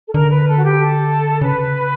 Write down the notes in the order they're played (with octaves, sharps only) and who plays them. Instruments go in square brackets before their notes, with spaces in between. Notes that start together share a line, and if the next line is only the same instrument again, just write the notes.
[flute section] A4
[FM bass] D3 [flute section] A#4
[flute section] B4
A4
F#4
G4
A4
[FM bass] C#3 [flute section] B4